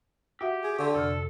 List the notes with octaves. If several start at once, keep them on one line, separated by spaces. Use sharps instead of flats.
F#4 G4 E5 F#5
G#4
D3 C6 C#6
F2 C3 A4 F6